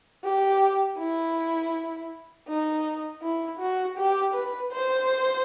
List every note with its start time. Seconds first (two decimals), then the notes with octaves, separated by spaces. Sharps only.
0.24 G4
0.99 E4
2.48 D#4
3.23 E4
3.60 F#4
3.98 G4
4.34 B4
4.72 C5